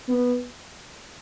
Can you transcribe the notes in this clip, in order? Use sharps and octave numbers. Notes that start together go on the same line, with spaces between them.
B3